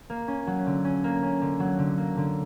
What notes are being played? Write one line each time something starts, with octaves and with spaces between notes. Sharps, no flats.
A#3
C#4
F#3
D3
C#4
A#3
C#4
D3
F#3
D3
A#3
D3